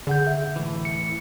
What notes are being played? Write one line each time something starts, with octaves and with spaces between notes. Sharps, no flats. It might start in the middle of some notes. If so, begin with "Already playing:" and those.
D3 G#4 F#5 G6
E5
A2 E3
C#7